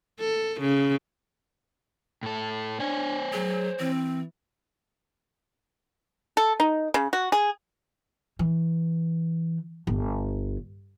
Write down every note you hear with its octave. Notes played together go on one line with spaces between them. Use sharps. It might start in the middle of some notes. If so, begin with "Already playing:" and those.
A4
C#3
A2 A4
D4 C5 C#5 G#5
F#3 G#4
E3 C4
A4
D#4
C#3
F#4
G#4
E3
G1